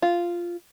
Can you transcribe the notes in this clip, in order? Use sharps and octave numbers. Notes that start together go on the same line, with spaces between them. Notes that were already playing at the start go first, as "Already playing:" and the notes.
F4